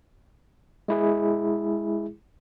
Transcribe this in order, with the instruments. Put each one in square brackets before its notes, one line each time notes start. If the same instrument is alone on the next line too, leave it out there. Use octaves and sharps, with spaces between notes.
[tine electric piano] G#3 E4 G#4